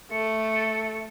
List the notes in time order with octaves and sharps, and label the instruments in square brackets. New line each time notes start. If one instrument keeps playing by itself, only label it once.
[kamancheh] A3 [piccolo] C#7